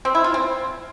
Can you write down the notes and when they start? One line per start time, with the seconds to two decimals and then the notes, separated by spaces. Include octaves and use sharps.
0.05 C4
0.15 E4
0.24 F4
0.34 C4